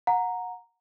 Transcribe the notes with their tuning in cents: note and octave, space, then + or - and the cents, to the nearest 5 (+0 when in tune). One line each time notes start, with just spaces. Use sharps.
F#5 -25 A#5 +0